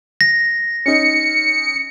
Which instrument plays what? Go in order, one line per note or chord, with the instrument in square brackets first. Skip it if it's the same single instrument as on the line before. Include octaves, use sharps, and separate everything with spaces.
[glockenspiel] A#6
[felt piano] C#4 D#4 [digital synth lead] C#7